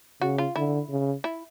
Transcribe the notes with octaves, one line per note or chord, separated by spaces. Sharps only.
C#3 F#4
F4
D3 E4
C#3
E4